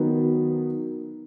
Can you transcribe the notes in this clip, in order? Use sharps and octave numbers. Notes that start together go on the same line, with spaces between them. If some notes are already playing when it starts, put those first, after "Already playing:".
Already playing: D#3 F#3 B3